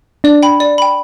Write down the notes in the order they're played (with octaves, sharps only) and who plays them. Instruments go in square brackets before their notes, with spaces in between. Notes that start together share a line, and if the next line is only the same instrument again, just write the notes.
[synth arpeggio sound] D4 [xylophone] D5
[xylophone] G5 B5
D5
G5 B5